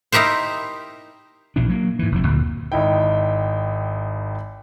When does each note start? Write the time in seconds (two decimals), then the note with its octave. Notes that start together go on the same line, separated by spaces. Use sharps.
0.12 D#4 E4 G4 A#4 C5
1.56 A#1 B2 E3 D4
1.69 F#3 A#3
1.99 G#2 E3
2.12 F1 D#2 F3
2.24 D2 A#2 D3 D#3
2.72 G#1 D#4 E4 G5